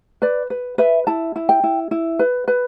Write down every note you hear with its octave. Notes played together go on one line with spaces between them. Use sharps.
B4 D5
B4
B4 E5
E4 A5
E4
G5
E4
E4
B4
B4